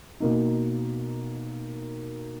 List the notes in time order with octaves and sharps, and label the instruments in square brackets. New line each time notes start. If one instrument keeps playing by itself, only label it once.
[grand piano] B2 A#3 D#4